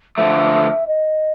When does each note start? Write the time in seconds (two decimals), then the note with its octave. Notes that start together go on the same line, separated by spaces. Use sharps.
0.17 D3 F3 A3 E5
0.87 D#5